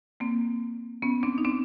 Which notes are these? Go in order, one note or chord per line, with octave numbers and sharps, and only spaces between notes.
A#3 C4
B3 C#4
C4 D4
D#4
C4 D4